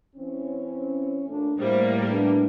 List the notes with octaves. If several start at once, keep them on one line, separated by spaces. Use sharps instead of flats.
E3 C4 C#4
A#2 A3 D4
A2 G3 A#3 E4 A#4 C5
E3 B3 D4